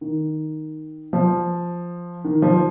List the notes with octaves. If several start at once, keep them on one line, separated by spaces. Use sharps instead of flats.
D#3
F3
D#3
F3